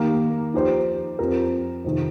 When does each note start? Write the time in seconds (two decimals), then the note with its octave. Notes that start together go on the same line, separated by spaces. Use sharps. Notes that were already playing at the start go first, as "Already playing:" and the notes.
Already playing: D#3 A#3 G4 A#4
0.54 F3 D#4 G4 C5
1.19 F2 F3 C4 G4 A#4
1.85 F2 C3 D#3